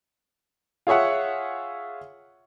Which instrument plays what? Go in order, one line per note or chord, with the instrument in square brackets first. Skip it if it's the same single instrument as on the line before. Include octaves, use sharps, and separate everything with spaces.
[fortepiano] F4 G#4 C#5 E5 F#5